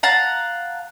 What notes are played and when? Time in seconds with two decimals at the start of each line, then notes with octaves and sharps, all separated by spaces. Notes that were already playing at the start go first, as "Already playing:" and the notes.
0.03 F5 F#5 A5 A#5